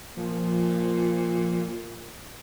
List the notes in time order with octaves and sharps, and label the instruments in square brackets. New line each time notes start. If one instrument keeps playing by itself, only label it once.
[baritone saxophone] A#2 [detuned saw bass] F3